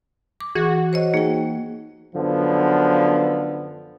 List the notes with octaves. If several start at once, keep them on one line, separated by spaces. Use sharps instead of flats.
D6
E3 F#4 G#4
C5 C#5 D#5
A#3 D#4 G#4 G5
F#2 D3 F3 B3